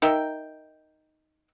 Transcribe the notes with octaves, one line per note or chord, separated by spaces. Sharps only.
D#4 A#4 E5 G5